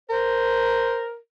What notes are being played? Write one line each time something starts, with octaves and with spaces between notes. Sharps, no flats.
A#4 C5